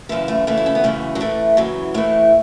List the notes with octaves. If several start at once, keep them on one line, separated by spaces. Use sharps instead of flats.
F#2 C#3 E3 E4
A3
F#2 C#3 E3 A3
E4
C#4
B3
F#2 C#3 E3 A3
F#3
A2 E3 A3
F#2 C#3 E3 F#3
A2 E3 A3